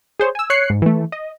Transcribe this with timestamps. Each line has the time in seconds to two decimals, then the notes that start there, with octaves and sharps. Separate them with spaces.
0.20 G#4 C5 C#5
0.35 G#5 E6
0.50 C#5 F#6 C7 C#7
0.70 G#2
0.82 E3 A3
1.12 D#5